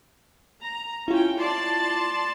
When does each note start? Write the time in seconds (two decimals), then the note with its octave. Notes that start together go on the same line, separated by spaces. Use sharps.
0.61 A#5
1.08 C#4 E4 F4 G5
1.39 D5 A5 C6